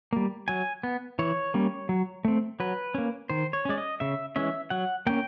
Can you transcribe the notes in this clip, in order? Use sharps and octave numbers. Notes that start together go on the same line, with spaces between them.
G3 A#3
F#3 G#5
B3
E3 C#5
G3 A#3 C#4
F#3
A3 C4
F#3 B4
A#3 C#4
D#3 C5
C#5
G#3 C#4 D5
D#5
C#3 E5
E3 G#3 C#4 E5
F#3 F#5
A#3 C#4 G5